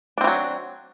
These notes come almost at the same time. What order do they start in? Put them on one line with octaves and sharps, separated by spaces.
D4 C4 E3 F#3